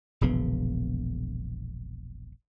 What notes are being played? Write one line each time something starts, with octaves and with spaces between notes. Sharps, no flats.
E1 A#1 C#3 B3